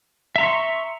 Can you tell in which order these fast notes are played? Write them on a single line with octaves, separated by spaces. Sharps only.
E5 A#5 C6 C#6